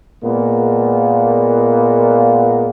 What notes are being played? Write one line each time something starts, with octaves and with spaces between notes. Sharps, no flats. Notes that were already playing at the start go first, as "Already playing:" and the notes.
A#2 G#3 A#3 B3